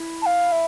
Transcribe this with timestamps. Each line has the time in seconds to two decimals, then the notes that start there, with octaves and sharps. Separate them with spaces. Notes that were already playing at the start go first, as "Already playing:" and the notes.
Already playing: E4
0.22 A5
0.26 F5
0.52 E5